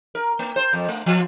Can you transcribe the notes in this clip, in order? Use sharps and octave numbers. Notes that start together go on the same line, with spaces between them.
A#4
A#3
C5
F2
A3
F3